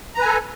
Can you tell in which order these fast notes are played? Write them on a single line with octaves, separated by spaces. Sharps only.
A#5 B4 G#5 A4